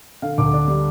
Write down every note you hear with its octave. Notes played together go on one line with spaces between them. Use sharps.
D3 F5
D2 D6
D4
G3